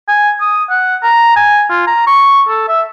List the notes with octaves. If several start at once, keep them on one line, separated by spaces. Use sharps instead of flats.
G#5
D#6
F#5
A#5
G#5
F4
A#5
C#6
A4
E5